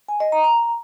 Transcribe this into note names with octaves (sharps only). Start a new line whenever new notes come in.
G#5
D#5
A#5
A#5